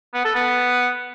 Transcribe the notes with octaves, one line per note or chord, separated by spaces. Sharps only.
B3
A4
B3